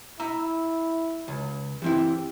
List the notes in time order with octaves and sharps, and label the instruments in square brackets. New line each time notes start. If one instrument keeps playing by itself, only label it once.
[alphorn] E4 [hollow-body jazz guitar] E5 A#5
[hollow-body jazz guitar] C#2
[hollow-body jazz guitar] E3 C4 E4 [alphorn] G4